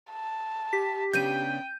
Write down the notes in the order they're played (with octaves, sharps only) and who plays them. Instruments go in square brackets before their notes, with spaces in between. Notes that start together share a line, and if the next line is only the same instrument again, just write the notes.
[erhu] A5
[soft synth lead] G4 [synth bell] B6
[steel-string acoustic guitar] C#3 B3 D4 [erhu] G5 [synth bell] G6 D#7